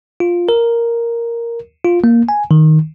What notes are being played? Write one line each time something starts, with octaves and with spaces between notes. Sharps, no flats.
F4
A#4
F4
A#3
G#5
D#3